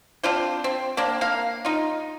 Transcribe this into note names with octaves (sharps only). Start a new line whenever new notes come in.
C4 D4 F4 C5
C4
A#3 C4 D4
A#3 F5
D#4 F4